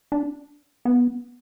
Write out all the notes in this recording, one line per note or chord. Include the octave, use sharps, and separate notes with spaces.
D4
B3